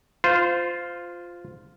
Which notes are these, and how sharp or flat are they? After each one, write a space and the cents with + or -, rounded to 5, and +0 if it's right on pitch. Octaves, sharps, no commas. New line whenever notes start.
F4 +0 C5 -20